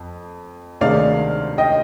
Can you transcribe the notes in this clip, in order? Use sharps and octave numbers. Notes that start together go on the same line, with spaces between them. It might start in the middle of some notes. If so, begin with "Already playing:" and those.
Already playing: F2
D2 C3 D#3 G#3 D5 F5
D#5 G5